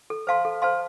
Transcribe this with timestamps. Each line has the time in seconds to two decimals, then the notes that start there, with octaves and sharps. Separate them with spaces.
0.10 A4
0.27 C5 F5 A5 C6
0.45 A4
0.62 C5 F5 A5 C6